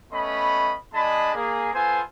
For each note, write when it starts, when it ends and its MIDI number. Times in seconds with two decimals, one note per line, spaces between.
0.13 0.74 57
0.13 0.74 59
0.13 0.74 61
0.13 0.74 75
0.13 0.74 83
0.94 1.31 56
0.94 1.31 62
0.94 1.31 68
0.94 1.31 75
0.94 1.31 81
0.94 1.31 83
1.35 1.71 58
1.35 1.71 68
1.73 2.01 59
1.73 2.01 65
1.73 2.01 69
1.73 2.01 72
1.73 2.01 80